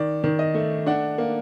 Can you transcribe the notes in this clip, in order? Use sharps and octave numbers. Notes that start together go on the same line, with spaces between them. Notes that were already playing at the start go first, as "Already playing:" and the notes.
Already playing: D#3 D5
D#3
D#5
A3
D4 F#5
A#3